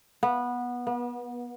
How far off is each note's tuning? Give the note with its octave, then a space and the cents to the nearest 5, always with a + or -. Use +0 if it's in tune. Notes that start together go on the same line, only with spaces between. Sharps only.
B3 -15
B3 -35